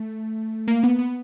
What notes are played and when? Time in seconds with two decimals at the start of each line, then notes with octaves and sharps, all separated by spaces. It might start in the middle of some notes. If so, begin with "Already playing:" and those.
Already playing: A3
0.68 A#3
0.83 B3
0.99 B3